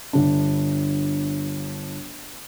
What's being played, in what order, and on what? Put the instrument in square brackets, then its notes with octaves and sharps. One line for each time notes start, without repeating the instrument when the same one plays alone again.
[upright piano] G1 D4